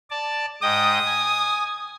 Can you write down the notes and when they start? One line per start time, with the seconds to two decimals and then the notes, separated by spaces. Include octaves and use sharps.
0.10 D5 A5
0.62 G#2 D#5 G5 D#6
1.06 G#5